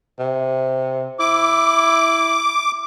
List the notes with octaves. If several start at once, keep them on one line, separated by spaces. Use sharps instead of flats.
C3
E4 D6